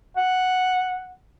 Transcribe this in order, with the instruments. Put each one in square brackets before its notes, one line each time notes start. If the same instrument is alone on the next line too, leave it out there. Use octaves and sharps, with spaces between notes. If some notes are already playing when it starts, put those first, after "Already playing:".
[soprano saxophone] F#5